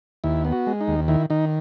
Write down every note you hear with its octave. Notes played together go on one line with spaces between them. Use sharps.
D#2 E4
B3
F#4
G#3
D#4
D#2
D#3 E4
D#3 D#4